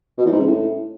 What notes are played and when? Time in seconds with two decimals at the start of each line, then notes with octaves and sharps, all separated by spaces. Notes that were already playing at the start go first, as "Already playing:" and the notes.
0.18 B2
0.25 E2
0.32 G#2
0.39 C#3
0.46 A2